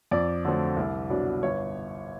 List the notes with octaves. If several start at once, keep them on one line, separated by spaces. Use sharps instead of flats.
F2 D5
D3 F#3 A3 C4
C2
B2 F#3 B3 D4
G1 C#5